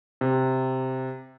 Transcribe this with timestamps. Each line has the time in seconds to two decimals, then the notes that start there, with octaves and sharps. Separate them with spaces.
0.21 C3